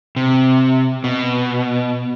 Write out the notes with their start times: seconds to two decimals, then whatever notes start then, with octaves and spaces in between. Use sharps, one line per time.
0.16 C3
1.04 B2